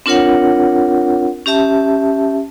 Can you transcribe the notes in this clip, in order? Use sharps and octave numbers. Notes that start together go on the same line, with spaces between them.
C4 D4 F4 A#4 C#5 F#5
C#4 G4 E5 A5